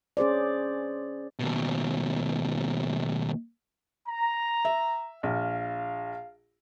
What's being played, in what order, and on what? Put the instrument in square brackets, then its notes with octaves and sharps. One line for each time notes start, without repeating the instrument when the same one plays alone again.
[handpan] C#4 G#4 C5 D5
[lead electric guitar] D#2 B2
[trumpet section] A#5
[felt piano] E5
[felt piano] A#1 [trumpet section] F5